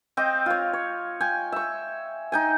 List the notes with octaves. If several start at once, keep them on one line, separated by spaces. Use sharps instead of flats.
C4 D#5 G5 D6
F4 C#5
C#5
G5 G#5
E5 C#6
D#4 G5 G#5